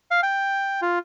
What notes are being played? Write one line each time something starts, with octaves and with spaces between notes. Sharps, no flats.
F5
G5
F4